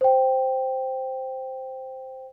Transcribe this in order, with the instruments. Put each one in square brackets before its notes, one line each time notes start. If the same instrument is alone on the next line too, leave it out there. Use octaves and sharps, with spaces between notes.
[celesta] C5 G5